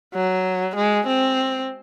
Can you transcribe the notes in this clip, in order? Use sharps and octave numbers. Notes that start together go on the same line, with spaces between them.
F#3
G#3
C4